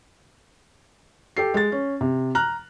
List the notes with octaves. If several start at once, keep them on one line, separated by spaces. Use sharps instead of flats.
G4 A4 C7
G#3 A6
C#4
C3
A#5 F6 F#6